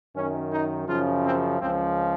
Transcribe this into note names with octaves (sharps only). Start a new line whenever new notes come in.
F#2 D#3 C#4
D#4
F#2 C#3 F3 F4
C4
C#2 C#3 F3 C4